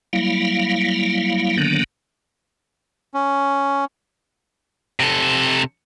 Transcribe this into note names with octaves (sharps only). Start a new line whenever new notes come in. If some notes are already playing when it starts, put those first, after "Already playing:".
F#3 G3 A#3 E4 F5
D3 D#3 F#3 A#3 B3 D4
C#4
C3 A4